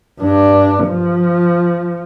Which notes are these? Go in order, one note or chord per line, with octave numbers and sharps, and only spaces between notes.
G2 D4
F3